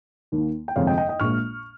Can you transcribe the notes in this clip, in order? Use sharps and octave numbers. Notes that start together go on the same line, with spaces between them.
D#2 D#3 A#3
G5
G1 F2 C3 F3 G#3 C#5 F5
D#5 G5
D#5 G5
D#5 G5
A#1 A#2 G#3 C#6 F6